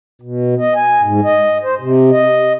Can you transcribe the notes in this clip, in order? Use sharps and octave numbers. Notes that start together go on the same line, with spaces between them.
B2
D#5
G#5
G#2
D#5
C5
C3
D#5